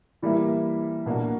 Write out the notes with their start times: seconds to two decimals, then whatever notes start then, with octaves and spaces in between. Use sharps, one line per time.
0.22 E3 G3 A#3 E4
1.06 B2 A#3 D4 F#4